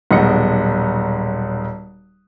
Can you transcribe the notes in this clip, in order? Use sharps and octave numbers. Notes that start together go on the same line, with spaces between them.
D#1 B1 G#3 D#5 F#5 C#7